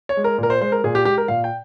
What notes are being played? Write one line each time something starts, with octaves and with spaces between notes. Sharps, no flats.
C#5
G#3
A#4
A#2 A#4
C5
G#3 C5
A#4
A#2 G#4
G4
G#3 G4
A#4
A#2 F5
G5